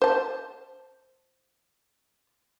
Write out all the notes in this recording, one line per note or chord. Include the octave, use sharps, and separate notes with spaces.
C5 A5